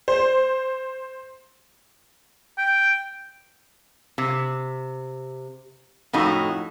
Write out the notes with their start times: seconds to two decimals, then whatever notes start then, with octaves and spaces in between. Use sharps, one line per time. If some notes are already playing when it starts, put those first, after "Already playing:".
0.08 C5
2.58 G5
4.18 C3
6.13 F2 A2 D#4 F#4